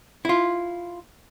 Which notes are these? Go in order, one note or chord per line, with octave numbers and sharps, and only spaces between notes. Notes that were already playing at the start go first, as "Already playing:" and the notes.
E4 F4